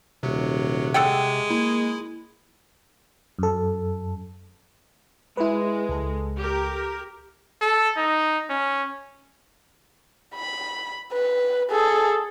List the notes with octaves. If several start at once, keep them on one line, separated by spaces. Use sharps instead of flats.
D#1 C3 F#3
G#3 A4 F#5 G5
A#3 E4
F#2 A4
G#3 E4 B4
C#2 A4
G4 A#4
A4
D#4
C#4
B5
B4
G#4 A4